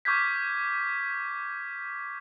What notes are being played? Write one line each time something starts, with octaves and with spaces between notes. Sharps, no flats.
C#6 D6 F6 G6 G#6 B6